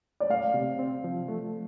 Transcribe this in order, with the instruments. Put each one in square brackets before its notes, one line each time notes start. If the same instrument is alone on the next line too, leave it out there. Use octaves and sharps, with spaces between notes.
[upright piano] D5
[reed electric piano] A3 [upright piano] F5
[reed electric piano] C3
C4
F3
A3